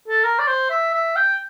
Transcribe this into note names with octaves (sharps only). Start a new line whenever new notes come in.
A4
A#4
D5
C5
E5
E5
G5